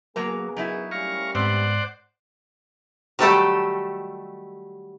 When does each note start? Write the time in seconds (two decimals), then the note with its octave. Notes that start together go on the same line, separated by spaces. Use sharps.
0.16 C#3 F#3 A#3 B3 G#4 A#4 A#5
0.57 F#3 D#4 E4
0.91 G3 A3 C#4 F5 A#5 C#6
1.35 G#2 B3 C4 C5 D5 F#5
3.19 D#3 F#3 G3 A3 G4 A4